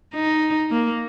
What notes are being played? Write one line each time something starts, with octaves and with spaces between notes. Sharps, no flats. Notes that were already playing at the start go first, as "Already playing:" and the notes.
D#4
A#3